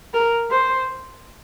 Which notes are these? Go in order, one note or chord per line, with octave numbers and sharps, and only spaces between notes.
A#4
C5